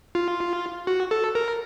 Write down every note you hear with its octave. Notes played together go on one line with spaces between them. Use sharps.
F4
F#4
A4
A#4